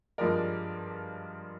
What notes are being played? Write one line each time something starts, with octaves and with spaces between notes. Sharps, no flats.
G2 F3 G#3 A#4 D5